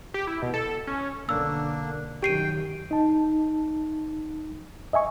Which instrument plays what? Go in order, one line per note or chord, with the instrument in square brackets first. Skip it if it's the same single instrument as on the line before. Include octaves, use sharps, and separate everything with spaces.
[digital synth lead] G4
E4
B2
A4
C#4
[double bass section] B1 D3 [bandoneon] A#3 D4 [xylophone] E6
[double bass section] F#2 D#3 [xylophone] G4 C7 D#7 [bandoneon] G5
[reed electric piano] D#4 A5
D#5 E5 G#5 C#6